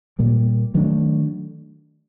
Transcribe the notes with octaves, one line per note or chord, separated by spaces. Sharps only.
A#2 G3 A#3
D#3 F#3 A3 D4